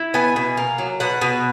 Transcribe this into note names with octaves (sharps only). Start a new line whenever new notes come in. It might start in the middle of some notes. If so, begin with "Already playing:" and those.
Already playing: E4
B3 G#5
B2
A#3
F#3
B2 F#5
B2